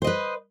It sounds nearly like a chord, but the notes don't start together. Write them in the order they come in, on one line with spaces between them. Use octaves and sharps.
C5 D#5 B4